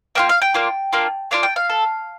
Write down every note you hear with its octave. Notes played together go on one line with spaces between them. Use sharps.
A#3 D4 F4 G5
F5
G5
A#3 D4 F4
A#3 D4 F4
A#3 D4 F4 F5
G5
F5
A4